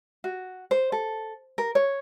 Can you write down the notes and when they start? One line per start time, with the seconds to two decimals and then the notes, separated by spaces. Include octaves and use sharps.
0.24 F#4
0.71 C5
0.92 A4
1.58 A#4
1.75 C#5